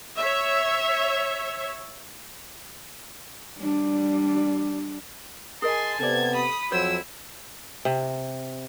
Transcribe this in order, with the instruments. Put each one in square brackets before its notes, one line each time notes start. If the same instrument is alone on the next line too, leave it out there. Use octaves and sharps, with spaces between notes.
[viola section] C#5 E5
[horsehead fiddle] G3 D4
[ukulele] G#4 A#4 D#5 [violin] G#5 C6 [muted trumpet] A5
[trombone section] C3 B3 [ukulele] A4 D5 [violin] G#6
[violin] B5 D#6
[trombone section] F2 F3 F#3 [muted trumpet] E4 [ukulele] C5 [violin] E6
[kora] C3